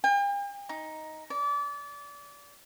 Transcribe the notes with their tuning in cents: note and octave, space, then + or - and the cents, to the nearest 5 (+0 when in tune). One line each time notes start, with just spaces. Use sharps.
G5 +45
D#4 +5
D5 -30